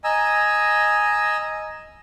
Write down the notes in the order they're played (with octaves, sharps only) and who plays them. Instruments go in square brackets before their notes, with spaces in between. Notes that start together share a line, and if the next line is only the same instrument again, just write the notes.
[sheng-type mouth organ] D#5 G#5 A#5 E6